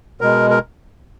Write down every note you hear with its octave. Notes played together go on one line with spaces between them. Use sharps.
B2 G#3 A#4
A#4